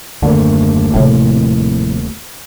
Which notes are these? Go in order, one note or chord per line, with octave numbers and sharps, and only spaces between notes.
D#1 F#2 D3 A3 A#3
A2 C3 F3